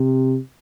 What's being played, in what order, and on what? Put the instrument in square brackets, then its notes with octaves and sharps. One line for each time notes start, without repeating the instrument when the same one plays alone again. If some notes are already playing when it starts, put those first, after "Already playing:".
Already playing: [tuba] C3